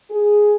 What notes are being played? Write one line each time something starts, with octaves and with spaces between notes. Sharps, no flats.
G#4